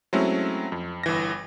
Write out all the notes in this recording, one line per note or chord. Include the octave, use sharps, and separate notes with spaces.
F#3 G#3 A3 C4 C#4 E4
F2
G1 E3 A#6